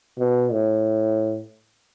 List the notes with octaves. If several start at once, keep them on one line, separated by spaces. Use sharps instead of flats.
B2
A2